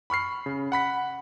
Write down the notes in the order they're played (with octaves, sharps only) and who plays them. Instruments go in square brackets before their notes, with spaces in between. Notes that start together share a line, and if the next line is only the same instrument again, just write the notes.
[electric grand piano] B5 C#6 F6 C7
C#3
F#5 B5 B6